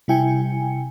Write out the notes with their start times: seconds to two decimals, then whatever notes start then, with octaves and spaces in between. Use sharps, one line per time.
0.08 C3 G3 E4 G5 G#5 C#7